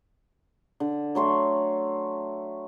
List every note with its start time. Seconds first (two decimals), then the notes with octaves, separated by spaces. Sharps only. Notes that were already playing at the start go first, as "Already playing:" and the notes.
0.80 D3
1.15 F#3 A3 C6 C#6